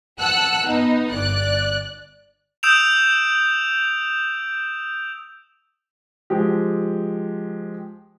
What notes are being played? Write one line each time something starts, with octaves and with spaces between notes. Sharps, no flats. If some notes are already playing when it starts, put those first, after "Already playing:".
F#5 A5 E6 F#6
B3 D#4
G1 D5 F#6
D#6 E6 G6 D7 E7 F7
F3 G#3 G4